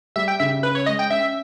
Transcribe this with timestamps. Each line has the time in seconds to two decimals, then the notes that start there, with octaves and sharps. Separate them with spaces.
0.16 G3 E5
0.28 G5
0.40 C#3 E5
0.63 C#4 B4
0.75 C#5
0.86 G#3 D#5
0.99 G5
1.10 C#4 E5